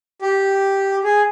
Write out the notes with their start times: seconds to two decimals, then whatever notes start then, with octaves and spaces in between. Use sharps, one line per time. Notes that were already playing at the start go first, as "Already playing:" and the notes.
0.22 G4
1.04 G#4